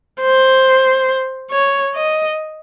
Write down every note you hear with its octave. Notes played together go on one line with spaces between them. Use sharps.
C5
C#5
D#5